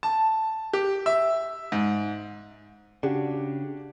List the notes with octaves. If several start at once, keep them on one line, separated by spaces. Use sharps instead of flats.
A5
G4
E5
G#2
C#3 D4 F#4 G4